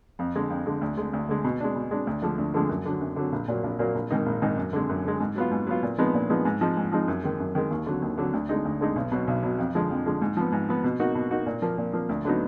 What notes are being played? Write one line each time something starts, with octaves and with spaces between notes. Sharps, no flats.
F2
D3 G#3
F2
D3 G#3
D2
D3 G#3
D2
D3 G#3
B2
G#3 D4
B2
G#3 D4
D2
D3 F3 G#3
D2
D3 F3 G#3
F#2
D3 F#3
F#2
D3 F#3
A#1
A#2 F#3 A#3
A#1
A#2 F#3 A#3
A#1
G#2 D#3 A#3 D#4
A#1
G#2 D#3 A#3 D#4
F#2
D3 G#3
F#2
D3 G#3
G#2
F#3 B3 F4
G#2
F#3 B3 F4
A#2
F3 G#3 B3 D#4
A#2
F3 G#3 B3 D#4
G#2
F3 G#3 D#4
G#2
F3 G#3 D#4
F#2
D#3 G#3
F#2
D#3 G#3
D#2
D3 F#3
D#2
D3 F#3
D2
D3 G#3 D#4
D2
D3 G#3 D#4
B1
B2 F#3
B1
B2 F#3
F2
D3 F3 G#3
F2
D3 F3 G#3
G#2
F3 B3
G#2
F3 B3
B2
A#3 D#4 F#4
B2
A#3 D#4 F#4
A#2
F3 A#3
A#2
F3 A#3
D2
D3 F#3 B3 D#4